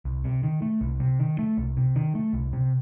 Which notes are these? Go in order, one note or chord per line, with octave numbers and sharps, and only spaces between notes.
C2
C3
D#3
A3
C2
C3
D#3
A3
C2
C3
D#3
A3
C2
C3